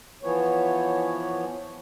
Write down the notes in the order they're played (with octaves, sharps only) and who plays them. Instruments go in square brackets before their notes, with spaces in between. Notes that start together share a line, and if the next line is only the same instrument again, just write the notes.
[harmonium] E3 F3 B3 C#5